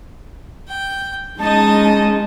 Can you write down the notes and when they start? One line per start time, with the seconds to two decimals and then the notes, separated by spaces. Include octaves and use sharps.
0.67 G5
1.39 G#3 C#4 D#4 D#5 A5
1.84 A5